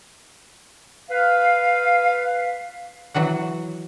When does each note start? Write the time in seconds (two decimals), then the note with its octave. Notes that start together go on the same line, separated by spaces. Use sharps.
1.11 B4 F5
3.14 E3 F#3 F#4 F#5